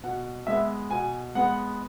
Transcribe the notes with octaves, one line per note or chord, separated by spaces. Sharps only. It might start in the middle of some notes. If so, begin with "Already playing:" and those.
B2 F#5
G#3 B3 E5
B2 G#5
G#3 B3 F#5